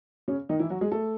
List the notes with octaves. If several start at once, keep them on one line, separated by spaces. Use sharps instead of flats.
C#3 C#4
D#3 D#4
E3 E4
F#3 F#4
G#3 G#4
A3 A4